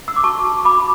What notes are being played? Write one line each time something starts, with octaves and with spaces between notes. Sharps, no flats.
E6
D6
F#4 A5 C#6
F#4
B5 D6
F#4